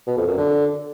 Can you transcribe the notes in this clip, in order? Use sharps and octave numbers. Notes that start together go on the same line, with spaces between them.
B2
F2
F#2
D3